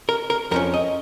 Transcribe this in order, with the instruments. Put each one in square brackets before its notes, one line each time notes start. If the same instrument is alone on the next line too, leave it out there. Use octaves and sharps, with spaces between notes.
[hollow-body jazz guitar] A#4
A#4
F2 F3 C#4 A#4
D#5